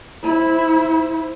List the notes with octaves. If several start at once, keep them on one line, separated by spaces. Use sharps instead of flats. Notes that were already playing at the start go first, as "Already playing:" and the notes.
E4 C5